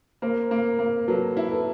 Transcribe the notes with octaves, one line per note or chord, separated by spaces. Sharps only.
A#3 A#4 C5
A#3
A#3
F#3 A4 B4
E4
A4 B4